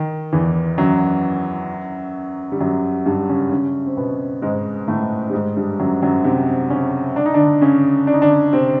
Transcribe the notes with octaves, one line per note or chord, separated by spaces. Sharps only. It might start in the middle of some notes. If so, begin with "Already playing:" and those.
Already playing: D#3
E2 E3
F#2 F#3
G3
F#2 F#3
G2 G3
C#3 C#4
C#3 C#4
C4
B2 B3
G#2 G#3
A2 A3
G3
G#2 G#3
G2 G3
F#2 F#3
F#2 F#3
C3 C4
C#3 C#4
D4
D#4
D3 D4
C#3 C#4
D4
D#4
D3 D4
C3 C4